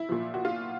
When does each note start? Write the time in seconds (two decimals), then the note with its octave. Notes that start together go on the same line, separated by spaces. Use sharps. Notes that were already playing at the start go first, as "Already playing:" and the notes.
Already playing: E4
0.09 A#2 F3
0.34 F#4
0.45 F4